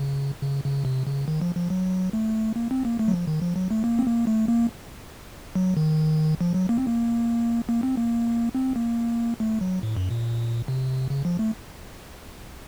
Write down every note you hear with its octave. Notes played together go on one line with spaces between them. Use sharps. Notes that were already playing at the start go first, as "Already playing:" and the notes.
Already playing: C#3
C#3
C#3
C3
C#3
D#3
F3
F3
F#3
A3
A#3
C4
A#3
A3
F#3
F3
D#3
F3
F#3
A3
A#3
C4
A#3
A3
A#3
F#3
D#3
F3
F#3
A#3
C4
A#3
A#3
C4
A#3
C4
A#3
A3
F#3
A2
F#2
A#2
C3
C#3
F3
A3